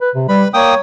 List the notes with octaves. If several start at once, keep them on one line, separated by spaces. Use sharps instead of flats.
B4
C3
G3 B4 B5
A#3 C#5 G5 D#6